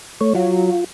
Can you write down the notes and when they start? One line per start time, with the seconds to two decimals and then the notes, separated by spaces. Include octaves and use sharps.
0.21 A3 C#5
0.35 F#3 F4